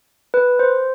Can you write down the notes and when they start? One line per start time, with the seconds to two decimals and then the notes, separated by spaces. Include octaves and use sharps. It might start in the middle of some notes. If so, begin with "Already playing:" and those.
0.34 B4
0.59 C5